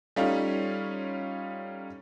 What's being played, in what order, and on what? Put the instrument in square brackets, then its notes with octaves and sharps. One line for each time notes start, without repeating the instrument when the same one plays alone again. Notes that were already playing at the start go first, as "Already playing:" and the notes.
[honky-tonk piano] G3 A3 C#4 D#4 F4